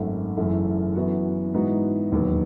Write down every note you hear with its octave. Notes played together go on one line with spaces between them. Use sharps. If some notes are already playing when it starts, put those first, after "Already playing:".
Already playing: G#1 F#2 D#3 A3
F#1 F#2 E3 A3
F#2 E3 B3 F#4
G#2 E3 B3 D#4 F#4
E1 D#2 D#3 F#3 B3